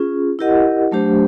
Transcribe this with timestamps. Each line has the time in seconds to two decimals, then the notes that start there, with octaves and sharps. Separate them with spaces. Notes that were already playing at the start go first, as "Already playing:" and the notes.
Already playing: C#4 F4 G#4
0.39 E4 G4 A#4 D#5 F#5
0.92 F#3 A3 D4 G4 C5